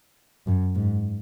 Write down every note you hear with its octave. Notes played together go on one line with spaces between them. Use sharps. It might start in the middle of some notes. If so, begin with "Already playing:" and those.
F#2
G#2